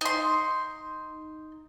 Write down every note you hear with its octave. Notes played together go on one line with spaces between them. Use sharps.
D#4 C6